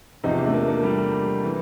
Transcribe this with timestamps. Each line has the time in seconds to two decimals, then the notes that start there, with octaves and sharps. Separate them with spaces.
0.24 E2 C3 F3 D#4
0.39 D4
0.47 A3
0.54 A#3
0.68 A#3
0.83 G3
1.44 E3